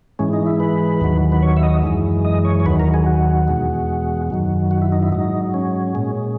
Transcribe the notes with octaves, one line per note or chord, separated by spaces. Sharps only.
G#2 E3 G#3 C#4
D#4
E4
B4
D#2 D#3 F#3
B4
C#5
E5
D#5
F#2 E3 G#3
D#5
C#5
C#5
D#2 D#3 F#3 B4
A#4
G#4
F#4
E2 B2 G#3
F#2 D#3 F#3
F#4
E4
D#4
E4
G#2 F#3 D#4
C#4
A#2 G#3